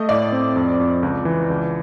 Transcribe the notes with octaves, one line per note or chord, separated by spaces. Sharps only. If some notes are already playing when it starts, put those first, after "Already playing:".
Already playing: A3 D#5
A2 D5
C4
F2
F2
C#2
E3
C#2